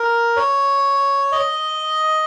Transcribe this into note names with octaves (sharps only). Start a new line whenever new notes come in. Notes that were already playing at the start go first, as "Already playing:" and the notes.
Already playing: A#4
C#5
D#5